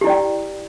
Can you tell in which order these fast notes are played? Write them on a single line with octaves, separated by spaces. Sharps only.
G4 E4 D5 G5